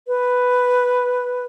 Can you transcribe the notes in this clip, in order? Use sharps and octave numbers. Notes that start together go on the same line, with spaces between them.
B4